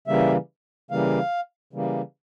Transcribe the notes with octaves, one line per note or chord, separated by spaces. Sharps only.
C#3 E3 G3 A#3 E5
C#3 E3 G3 A#3 F5
C#3 E3 G3 A#3